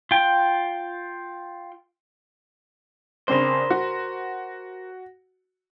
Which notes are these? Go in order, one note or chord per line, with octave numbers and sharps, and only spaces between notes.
F4 G5
C#3 C4 D4 A#4 C5
F#4